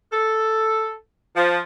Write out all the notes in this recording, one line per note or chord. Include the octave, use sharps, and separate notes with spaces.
A4
F3